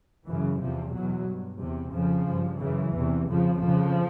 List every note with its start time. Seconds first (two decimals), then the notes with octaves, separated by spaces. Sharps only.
0.25 F#2 C#3 E3
0.60 E2 C3 F3
0.93 E2 B2 F#3
1.27 G2
1.60 E2 C3
1.93 F2 C#3 F3
2.26 G2
2.60 F#2 C#3 E3
2.93 E2 C3
3.28 F2 C#3 F3
3.60 F2 C#3 F3